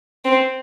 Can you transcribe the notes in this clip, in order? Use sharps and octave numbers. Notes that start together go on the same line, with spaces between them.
C4